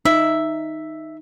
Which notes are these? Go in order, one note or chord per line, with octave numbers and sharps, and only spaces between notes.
D#4 E5